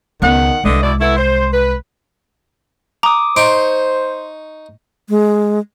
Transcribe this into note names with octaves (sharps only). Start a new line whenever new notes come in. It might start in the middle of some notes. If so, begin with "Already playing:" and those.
C#2 D#3 B3 F#5
C2 D3 E3 G#3 D#5
B2 E4 D5
A3 B3 E4
C5
B4
A#5 D6 D#6
D#4 C5 C6 C#6 D7
G#3